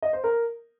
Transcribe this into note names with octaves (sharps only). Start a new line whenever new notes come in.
D#5
C5
A#4